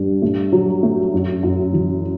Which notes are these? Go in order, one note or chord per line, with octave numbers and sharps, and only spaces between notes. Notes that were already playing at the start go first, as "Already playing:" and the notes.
Already playing: G2
A3
F#3
A3
F#2
F#2
E3